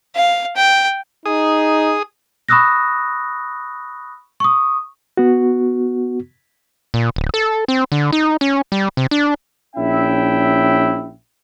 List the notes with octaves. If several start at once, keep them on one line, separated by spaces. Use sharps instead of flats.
F5
G5
D#4 G#4 D#6
B5 C#6 D#6 E6 F#6 A#6
C#6 D#6
B3 F#4
A#2
D1
A4
C4
D3
D#4
C#4
G3
C3
D4
A#1 C#4 E4 E5 G5